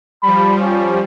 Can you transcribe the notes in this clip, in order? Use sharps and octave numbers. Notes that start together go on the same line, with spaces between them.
F3 G3 B5
C#4